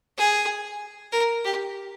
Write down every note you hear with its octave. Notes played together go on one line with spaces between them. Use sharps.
G#4
A#4
G4